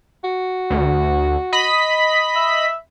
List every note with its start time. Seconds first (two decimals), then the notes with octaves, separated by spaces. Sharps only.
0.24 F#4
0.70 D2
1.53 D#5 B5 B6
2.36 E5